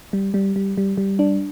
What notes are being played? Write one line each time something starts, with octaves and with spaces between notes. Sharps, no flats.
G3
G3
G3
G3
G3
D4